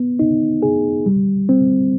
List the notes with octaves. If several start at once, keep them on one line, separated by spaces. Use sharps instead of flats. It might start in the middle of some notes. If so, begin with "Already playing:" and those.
Already playing: B3
D#4
G#4
G3
C4